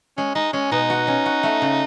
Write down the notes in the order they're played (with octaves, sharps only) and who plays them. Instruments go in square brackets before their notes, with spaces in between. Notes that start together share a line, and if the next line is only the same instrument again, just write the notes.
[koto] G#3 [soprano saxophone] C#4
[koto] G#3 [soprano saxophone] D#4
[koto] G#3 [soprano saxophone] C#4
[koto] B2 [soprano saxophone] D#4
[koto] F#4
C#4
F#4
A3
C#3